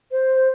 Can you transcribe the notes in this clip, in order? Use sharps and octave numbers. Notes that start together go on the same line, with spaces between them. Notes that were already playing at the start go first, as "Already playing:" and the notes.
C5